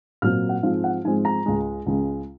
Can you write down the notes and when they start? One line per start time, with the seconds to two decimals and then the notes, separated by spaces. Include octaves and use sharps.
0.22 A#2 F#3 C4 F6
0.49 F#5
0.63 G#2 F3 G#3 C4 F5
0.84 F#5
1.04 G#2 F3 G#3 C4 G#5
1.25 A#5
1.46 C#2 C#3 G#3
1.86 C#2 C#3 G#3